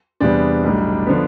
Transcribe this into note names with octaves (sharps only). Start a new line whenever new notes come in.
E2 C3 G3 B3 D4
B1 A2 G3
D3 F3 B3